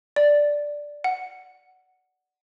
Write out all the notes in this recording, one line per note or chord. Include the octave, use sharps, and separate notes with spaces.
D5
F#5